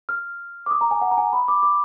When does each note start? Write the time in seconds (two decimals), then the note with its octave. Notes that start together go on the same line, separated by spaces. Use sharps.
0.09 F6
0.66 D6
0.71 D#6
0.81 A#5
0.91 G#5
1.01 F#5
1.11 A#5
1.18 G#5
1.33 B5
1.48 D6
1.63 D6